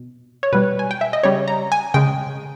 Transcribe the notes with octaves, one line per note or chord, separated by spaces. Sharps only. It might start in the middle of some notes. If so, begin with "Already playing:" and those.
Already playing: B2
C#5
B2 G3 B4
G#5
G5
E5
D#5
C#3 G3 C#5
A#5
G#5
C#3 G#3 G5